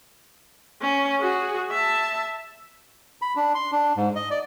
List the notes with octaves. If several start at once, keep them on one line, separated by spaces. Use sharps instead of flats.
C#4
F#4 G#4
E5 A5
B5
D4
C6
D4
G#2
D#5
D5